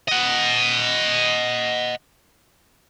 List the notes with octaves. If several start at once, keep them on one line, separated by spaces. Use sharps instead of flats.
D#5 F#5